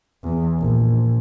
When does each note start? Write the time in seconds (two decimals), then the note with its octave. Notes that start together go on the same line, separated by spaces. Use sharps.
0.24 E2
0.59 A#1